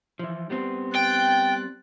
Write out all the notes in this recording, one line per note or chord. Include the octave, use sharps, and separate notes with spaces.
E3 F3
G3 B3 C4
G5 F#6 A6